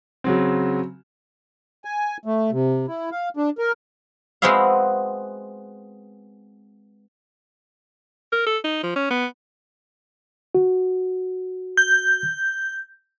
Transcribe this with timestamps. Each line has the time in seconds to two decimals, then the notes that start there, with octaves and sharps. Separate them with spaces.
0.24 C#3 F#3 C4
1.85 G#5
2.25 A3
2.51 C3
2.88 E4
3.12 F5
3.37 D4
3.58 A#4
4.42 G#3 B3 C4 F#4 E5 F5
8.33 A#4
8.47 A4
8.64 D#4
8.83 F3
8.96 C#4
9.11 B3
10.55 F#4
11.77 G6